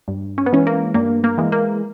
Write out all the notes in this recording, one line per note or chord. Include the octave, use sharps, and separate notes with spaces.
G2
C#4
B3
E3 G#3 C#4
A#3
G2 A#3
A#3
E3 G#3
A#3